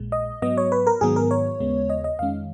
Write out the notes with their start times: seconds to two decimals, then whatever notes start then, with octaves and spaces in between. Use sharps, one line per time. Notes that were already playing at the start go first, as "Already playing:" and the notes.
Already playing: A#1 A#2 G#3
0.12 D#5
0.42 G#2 F#3 B3 D#5
0.57 C#5
0.72 B4
0.87 A#4
1.01 G#2 D#3 F#3 B3 G#4
1.16 A#4
1.31 C#5
1.60 D#2 C#3 G#3 B3
1.90 D#5
2.04 D#5
2.19 F2 D#3 G#3 C#4 F5